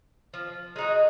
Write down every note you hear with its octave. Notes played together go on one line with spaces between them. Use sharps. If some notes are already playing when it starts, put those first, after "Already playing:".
F3
G#3 D#4 F#4